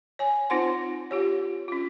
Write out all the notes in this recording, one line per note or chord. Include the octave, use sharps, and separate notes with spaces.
C#5 G#5
C4 D#4 F4 C5 F#5 C6
F4 G4 C#5
C#4 F4